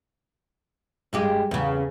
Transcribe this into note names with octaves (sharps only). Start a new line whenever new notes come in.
G2 G#3 G4
E2 C#3